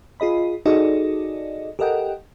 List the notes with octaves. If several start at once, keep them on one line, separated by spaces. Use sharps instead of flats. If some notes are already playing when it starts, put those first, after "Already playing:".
F4 G#4 D#5 B5
D#4 F#4 G#4 A4 D5 D#5
G4 A4 A#4 D#5 F#5 G5